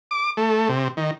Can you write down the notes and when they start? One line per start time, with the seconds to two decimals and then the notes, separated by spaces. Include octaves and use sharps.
0.11 D6
0.37 A3
0.69 C3
0.97 D#3